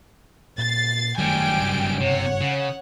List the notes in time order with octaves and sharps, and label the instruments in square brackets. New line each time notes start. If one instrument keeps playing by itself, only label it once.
[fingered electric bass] A#2 [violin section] A6 C7
[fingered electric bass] G1 D#3 A3 [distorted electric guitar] F#2 G3 [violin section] G5 G#5 D7
[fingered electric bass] F#1 G2 C#3
[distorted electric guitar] C3 [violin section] C#5 F#5
[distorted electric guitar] C#3